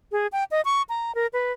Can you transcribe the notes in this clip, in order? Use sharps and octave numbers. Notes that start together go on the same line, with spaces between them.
G#4
G5
D#5
C#6
A#5
A#4
B4